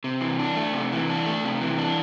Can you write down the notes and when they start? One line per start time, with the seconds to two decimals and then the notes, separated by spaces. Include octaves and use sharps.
0.04 C3
0.21 E3
0.39 D4
0.57 A3
0.73 C3
0.92 E3
1.09 D4
1.26 A3
1.44 C3
1.61 E3
1.78 D4